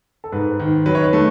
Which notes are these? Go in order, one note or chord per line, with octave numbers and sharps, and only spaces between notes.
A4
G#2 B4
D#3
F#3 B4
C#5
B4
A3